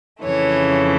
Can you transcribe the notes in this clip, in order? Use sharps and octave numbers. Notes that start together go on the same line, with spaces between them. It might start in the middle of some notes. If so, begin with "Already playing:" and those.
F2 C#3 E3 A3 C#5